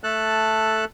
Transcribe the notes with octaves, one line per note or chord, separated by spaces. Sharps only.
A3 A4 A5 F#6